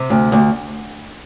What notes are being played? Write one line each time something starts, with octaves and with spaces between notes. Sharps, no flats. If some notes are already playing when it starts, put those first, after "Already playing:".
Already playing: C3
D2
D2